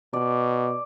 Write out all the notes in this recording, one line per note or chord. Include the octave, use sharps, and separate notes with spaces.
B2 D5